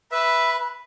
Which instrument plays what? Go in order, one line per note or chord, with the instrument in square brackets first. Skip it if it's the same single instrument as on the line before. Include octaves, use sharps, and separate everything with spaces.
[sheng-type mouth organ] B4 [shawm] E5 [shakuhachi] B5